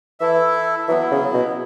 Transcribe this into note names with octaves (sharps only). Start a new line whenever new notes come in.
E3 E4 A4 E5
E3 F#3 B3 E4
C#3
B2